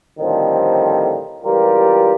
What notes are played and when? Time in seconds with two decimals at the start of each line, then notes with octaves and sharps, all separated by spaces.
0.19 A2 D3 D#3 F3 G3 C4
1.45 C#2 E3 G3 F4 G4 A#4